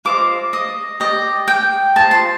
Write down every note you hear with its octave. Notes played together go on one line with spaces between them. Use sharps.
F4 C5 D#5 D6
D#5
G4 D5 D#5
G5
F4 C5 D#5 A5
C6